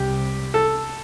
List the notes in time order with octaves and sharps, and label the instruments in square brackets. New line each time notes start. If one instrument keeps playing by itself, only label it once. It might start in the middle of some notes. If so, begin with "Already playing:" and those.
Already playing: [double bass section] C2 C3 G3 [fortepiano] G4
[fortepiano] A4